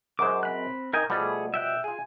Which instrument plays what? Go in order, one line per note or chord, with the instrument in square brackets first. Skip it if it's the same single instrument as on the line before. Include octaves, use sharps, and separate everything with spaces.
[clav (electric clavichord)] F#2 F#3 G#3 [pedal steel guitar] C5 D6
[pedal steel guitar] C4 B5 F#6
[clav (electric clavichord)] D#4 [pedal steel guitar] A#4 G5 G#5
[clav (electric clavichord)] B2 F3 G3 [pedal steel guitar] A3 G#4
[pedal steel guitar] E5 G5 F#6
[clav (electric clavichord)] F4 G#4 [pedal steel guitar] G#5